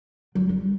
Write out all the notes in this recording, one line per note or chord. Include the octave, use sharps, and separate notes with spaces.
F#3
G3